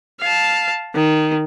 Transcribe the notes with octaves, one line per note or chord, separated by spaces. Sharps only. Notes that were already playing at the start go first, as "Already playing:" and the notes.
F5 A5
D#3